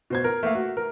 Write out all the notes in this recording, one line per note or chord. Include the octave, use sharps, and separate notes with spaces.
B2 C5 G#6
A#4
A3 A#3 F5
F#4
A#4